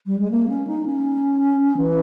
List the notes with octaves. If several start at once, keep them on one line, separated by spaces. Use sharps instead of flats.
G3
G#3
A#3
C#4
D#4
C#4
E3